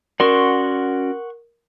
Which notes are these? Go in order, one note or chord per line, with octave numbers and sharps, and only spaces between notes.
C#4 F#4 A#4 D5 F#5 C6 C#6